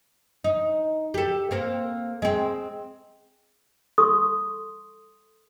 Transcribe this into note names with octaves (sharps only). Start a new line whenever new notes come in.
D#4
G4 A4
A#3 C4 A4
G#3 C4
A4 C6 C#6 D#6